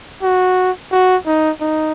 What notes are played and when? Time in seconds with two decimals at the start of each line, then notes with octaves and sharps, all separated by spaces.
0.23 F#4
0.92 F#4
1.26 D#4
1.61 D#4